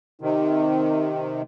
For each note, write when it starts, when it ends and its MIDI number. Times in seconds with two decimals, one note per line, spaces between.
0.22 1.42 48
0.22 1.42 51
0.22 1.17 63